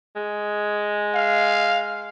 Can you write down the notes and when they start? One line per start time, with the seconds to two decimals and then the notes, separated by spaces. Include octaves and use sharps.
0.16 G#3
1.14 F5